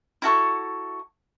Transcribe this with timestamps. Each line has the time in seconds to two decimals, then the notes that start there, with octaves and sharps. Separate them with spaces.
0.22 E4 F#4 A4 C#6